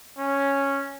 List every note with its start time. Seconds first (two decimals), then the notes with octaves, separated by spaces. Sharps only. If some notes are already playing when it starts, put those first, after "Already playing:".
0.18 C#4